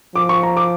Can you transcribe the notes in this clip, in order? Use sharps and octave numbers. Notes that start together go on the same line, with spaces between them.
F3 D6
C#6
A#5
D6